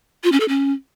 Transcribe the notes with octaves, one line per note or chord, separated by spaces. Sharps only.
F4
C#4
A4
C#4